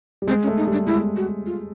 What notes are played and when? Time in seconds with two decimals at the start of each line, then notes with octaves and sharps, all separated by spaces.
0.22 G3
0.27 G#3 C4
0.43 C#4
0.48 A3
0.57 D#4
0.67 G3
0.72 D4
0.87 G#3 E4
1.16 F#4
1.46 F4